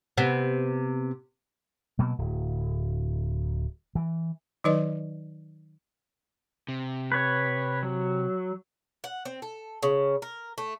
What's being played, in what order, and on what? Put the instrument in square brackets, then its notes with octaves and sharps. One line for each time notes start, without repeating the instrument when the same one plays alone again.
[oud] C3 B3
[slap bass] B2 F#3 A#3
D1
E3
[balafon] D#3 F#3 D#4 B4 D5 D#5
[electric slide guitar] C3
[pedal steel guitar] B4 C#5
F#3
[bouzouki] F#5
C4
A4
C#3
A#4
A3